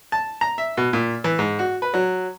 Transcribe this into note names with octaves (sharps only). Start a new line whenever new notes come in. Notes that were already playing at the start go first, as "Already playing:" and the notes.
A5
A#5
E5
B2
A#2
E3
G#2
F#4
B4
F#3